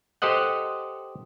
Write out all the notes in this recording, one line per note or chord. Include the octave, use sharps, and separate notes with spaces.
G4 A4 C5 D#5 F#5